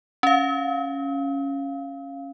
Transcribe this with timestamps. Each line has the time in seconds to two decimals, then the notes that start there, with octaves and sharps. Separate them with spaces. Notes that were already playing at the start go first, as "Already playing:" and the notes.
0.23 C#4 F5